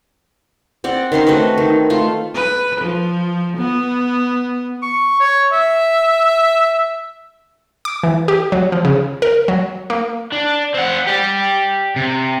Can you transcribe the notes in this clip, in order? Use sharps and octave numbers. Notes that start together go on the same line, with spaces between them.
C4 D5 F#5
D#3 C#4 C5 C6
A3 C4 F#4 B4
D#3
A3 F4
B4
F3
B3
C#6
C#5
E5
D6
E3
G4
F#3
F3
C#3
A#4
F#3
A#3
D4
C4 F#5
G4 D5
C3